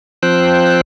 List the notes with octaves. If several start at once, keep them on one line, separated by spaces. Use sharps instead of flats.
F3 C4 C5 G5 F#6